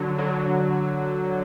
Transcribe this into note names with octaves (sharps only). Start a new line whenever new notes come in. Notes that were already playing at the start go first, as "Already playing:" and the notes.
Already playing: D3 F#3
D3 F#3